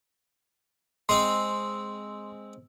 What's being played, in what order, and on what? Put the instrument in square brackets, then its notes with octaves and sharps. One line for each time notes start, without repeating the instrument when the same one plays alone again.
[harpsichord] G#3 C4 [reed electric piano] C6